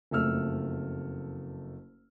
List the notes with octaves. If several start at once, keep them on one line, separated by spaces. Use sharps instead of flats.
F#1 F2 A3 E6 F6